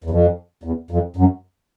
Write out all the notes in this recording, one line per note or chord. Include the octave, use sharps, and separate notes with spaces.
E2
F2
E2
F2
F#2